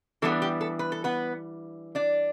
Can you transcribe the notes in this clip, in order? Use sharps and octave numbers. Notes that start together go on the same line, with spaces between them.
E3 G3 B3 D4 A4
G4
A4
B4
A4
B3 B4
D4 D5